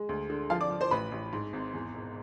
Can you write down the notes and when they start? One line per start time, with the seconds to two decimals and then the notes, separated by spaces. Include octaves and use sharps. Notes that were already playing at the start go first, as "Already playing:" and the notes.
Already playing: G#3
0.09 D2
0.30 D3
0.50 F3 F4 F5
0.61 D5 D6
0.71 F3
0.81 C5 C6
0.91 A1 B4 B5
1.12 A1
1.33 G#2
1.53 G#1
1.74 E2
1.94 E1